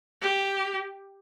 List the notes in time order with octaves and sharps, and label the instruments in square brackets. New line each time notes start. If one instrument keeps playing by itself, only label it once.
[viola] G4